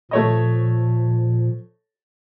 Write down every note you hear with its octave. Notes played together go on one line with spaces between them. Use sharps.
A#2 F3 A3 C#5 D#5